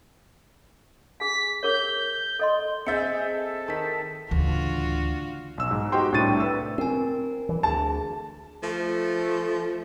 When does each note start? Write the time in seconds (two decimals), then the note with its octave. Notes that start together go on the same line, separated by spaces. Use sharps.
1.20 G#4 G#5 B6
1.63 G#4 A#4 C#5 G6
2.39 A4 D#5 C6
2.87 C4 G#4 D#5 E5 G6 A6 C#7
3.30 A4
3.68 D#3 A5 B6
4.31 D2 A2 C#3 E3 D4 F4 F#4
5.58 B1 E6
5.71 G#2
5.92 D#4 F#4 G4 C5 G5 C6
6.12 C2 A2 D4 C#6 A6 D#7
6.40 B4 E6
6.78 C4 A#4 G#5
7.49 E3
7.63 D2 G#4 A5
8.63 F3 A3